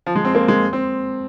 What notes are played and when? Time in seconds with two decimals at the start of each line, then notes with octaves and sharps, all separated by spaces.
0.06 F3
0.16 G#3
0.25 C4
0.35 A#3
0.48 G#3
0.73 C4